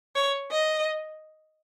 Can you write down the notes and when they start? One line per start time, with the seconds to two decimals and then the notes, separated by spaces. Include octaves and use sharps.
0.15 C#5
0.51 D#5